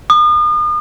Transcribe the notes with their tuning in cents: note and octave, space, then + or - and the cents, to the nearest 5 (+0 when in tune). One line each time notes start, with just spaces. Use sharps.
D#6 -40